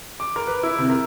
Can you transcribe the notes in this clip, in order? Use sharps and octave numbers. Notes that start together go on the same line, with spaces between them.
D6
A#4
B4
E4
C3
A#4